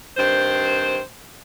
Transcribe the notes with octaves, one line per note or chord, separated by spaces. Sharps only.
G2 D#3 C4 C5